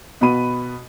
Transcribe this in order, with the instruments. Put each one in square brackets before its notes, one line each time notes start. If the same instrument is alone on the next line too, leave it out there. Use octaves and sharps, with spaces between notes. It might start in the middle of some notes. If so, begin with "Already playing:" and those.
[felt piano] B2 B3 F#4 B5 D#7